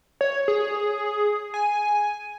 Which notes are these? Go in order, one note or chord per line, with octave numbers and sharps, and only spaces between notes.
C#5
G#4
G#5